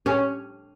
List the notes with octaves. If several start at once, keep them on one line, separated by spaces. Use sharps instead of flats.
C#4